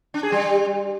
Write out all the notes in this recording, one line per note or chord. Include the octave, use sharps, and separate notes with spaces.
D4
G#4
G3